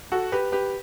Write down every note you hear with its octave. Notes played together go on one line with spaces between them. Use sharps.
F#4 A4
G4 B4
G4 B4